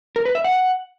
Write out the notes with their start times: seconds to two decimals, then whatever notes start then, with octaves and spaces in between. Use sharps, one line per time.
0.16 A#4
0.25 B4
0.35 E5
0.44 F#5